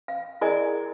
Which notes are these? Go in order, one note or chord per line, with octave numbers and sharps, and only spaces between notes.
F5
E4 G#4 A#4 D5 D#5 G#5